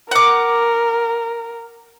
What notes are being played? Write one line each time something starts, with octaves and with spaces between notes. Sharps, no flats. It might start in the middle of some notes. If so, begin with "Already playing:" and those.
A#4 F#5 D6